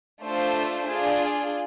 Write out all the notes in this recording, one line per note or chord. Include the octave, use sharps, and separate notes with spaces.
A3 D4 F4 A4 C5
D4 F4 G#4